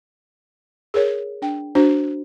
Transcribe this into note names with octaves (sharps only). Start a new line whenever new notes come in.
G#4 A#4 C#5
D4 G5
D4 F#4 C5